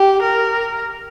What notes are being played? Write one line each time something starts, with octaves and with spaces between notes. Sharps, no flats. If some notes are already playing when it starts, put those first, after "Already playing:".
Already playing: G4
A#4